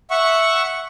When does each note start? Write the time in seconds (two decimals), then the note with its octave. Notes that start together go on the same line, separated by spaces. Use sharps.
0.10 E5 F#5 C#6